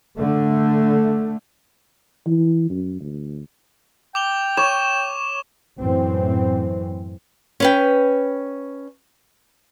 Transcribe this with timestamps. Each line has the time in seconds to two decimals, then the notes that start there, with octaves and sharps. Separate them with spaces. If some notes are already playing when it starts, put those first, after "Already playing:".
0.18 D3 A3
2.27 E3
2.70 F#2
3.00 D2
4.15 G5 D6 F7 G7
4.57 C#5 C#6 D6 E7
5.79 F#2 A2 E3 C4
7.60 C#4 B4 G5